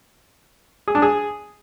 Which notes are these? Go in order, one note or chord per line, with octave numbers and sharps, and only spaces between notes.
G#4
D4
G#4